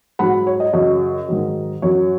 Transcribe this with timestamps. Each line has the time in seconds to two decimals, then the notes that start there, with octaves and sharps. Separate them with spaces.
0.19 G#2 F#3 F#5 B5
0.47 C#5
0.60 D#5
0.73 F#2 C#3 F#3 D#5
1.28 G#2 D#3 F#3
1.82 F#2 F#3 C#5